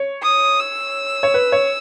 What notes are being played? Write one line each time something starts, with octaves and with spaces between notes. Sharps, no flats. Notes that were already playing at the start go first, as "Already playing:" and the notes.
Already playing: C#5
D#6
E6
C#5
B4
C#5